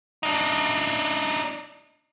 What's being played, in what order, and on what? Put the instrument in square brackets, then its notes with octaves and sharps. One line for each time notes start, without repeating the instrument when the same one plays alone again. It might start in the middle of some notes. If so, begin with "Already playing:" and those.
[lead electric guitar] D4 D#4